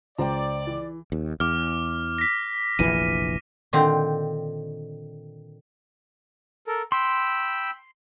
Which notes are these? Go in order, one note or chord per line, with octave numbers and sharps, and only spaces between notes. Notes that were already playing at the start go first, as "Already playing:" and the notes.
C#2 C5 D5 G5 A#5
E3
D#2
E2 D6 F6
A#6 B6
F1 A#1 E3 D#7
A#2 D3 D#3 C4
A4 A#4
G5 B5 C6 E6